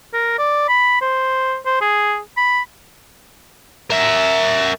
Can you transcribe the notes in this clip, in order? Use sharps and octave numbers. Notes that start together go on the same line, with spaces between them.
A#4
D5
B5
C5
C5
G#4
B5
A#4 E5